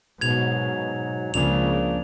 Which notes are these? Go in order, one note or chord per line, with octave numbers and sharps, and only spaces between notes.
G#2 B2 F#3 G#6 F7
C#2 C#3 F3 A#3 D4 F7